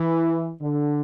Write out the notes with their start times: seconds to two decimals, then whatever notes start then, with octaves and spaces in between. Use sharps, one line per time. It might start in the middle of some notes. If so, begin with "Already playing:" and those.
Already playing: E3
0.61 D3